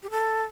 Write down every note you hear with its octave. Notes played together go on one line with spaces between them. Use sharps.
G4
A4